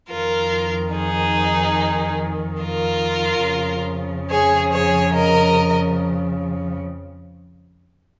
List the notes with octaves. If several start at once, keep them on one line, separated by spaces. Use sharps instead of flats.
F2 D#3 F4 A#4
D#4 G#4
F4 A#4
F2 C#3 F3
G#4 C#5
G#4 C#5
A#4 D#5